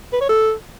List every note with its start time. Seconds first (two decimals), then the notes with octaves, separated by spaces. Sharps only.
0.13 B4
0.21 C#5
0.29 A4